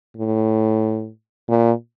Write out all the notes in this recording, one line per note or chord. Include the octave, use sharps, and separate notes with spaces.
A2
A#2